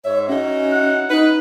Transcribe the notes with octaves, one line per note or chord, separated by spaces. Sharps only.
G#2 C#5 E5
C#4 D#4 E4 F#4
F#5
D#4 B4